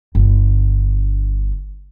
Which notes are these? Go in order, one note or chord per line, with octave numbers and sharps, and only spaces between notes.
G1 D3